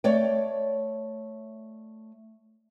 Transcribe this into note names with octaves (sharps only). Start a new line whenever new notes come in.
A3 C#5 D5 G5